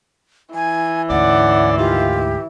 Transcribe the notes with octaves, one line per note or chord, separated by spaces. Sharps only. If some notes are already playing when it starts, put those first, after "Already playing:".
E3 G#5
D2 G#2 C#4 D5 F#5
D#3 F4 G4